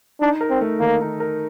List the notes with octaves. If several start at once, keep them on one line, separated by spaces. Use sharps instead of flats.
D4 D#4
A#4
C4
A3
D#3 A#3
D#4
A#4